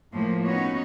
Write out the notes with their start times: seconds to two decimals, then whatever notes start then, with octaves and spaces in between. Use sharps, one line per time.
0.12 A2 F3 A#3
0.44 B3 C#4 D#4 F#4 C#5